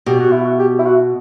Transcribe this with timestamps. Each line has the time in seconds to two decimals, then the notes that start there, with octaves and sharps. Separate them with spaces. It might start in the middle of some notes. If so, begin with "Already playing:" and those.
0.06 B2 G4
0.19 F#4
0.32 E4
0.44 F#4
0.59 G4
0.79 E4
0.86 F#4